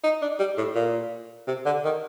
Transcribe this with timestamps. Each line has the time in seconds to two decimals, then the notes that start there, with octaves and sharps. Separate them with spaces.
0.04 D#4
0.22 D4
0.39 G3
0.57 A2
0.75 A#2
1.47 C3
1.65 D3
1.84 D#3